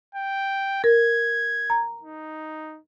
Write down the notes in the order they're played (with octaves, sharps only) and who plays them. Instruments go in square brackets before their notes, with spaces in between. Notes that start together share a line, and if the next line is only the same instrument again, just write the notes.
[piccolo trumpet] G5
[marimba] A#4 [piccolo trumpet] G#6
[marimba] A#5
[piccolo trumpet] D#4